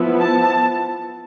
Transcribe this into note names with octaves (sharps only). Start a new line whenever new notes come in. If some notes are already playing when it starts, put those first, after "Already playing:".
Already playing: F3 B3 E4
A5